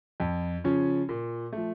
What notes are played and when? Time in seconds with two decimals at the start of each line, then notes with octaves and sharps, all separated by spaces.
0.20 F2
0.64 C#3 F3 C#4
1.09 A#2
1.53 F3 A3